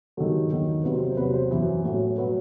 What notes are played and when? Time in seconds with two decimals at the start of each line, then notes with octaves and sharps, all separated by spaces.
0.17 G2 D#3 F#3 A4
0.51 E2 D#3 F#3
0.84 E2 C3 F#3 B4
0.92 C5
1.09 C5
1.17 E2 C3 F#3 B4
1.34 C5
1.51 F#2 E3
1.84 A2 F#3
2.18 B2 F#3 B4